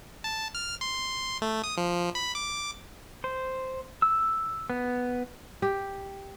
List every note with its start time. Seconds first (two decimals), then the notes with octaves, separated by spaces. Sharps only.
0.24 A5
0.55 F6
0.81 C6
1.42 A3
1.64 D#6
1.77 F3
2.15 B5
2.35 D6
3.24 C5
4.02 E6
4.70 B3
5.62 G4